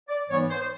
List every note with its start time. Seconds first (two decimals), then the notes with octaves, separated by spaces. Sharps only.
0.08 D5
0.29 G#2 E3 G3 B3 C#5
0.50 C5